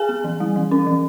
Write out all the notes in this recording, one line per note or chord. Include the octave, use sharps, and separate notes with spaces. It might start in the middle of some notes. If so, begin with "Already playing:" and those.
Already playing: G#4 G#5
B3
E3
G3
E3
C#4
E3